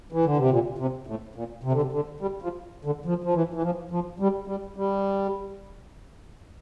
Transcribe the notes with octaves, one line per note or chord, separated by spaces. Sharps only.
E3
D3
C3
A#2
C3
A2
A#2
C3
D3
C3
D3
G3
F3
D3
F3
F3
E3
E3
F3
F3
G3
G3
G3